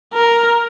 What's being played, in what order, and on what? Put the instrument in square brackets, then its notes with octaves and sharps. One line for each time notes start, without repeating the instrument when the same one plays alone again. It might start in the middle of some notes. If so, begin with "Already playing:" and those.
[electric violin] A#4